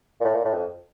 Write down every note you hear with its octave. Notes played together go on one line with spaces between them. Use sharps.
A#2
A2
A#2
A2
F2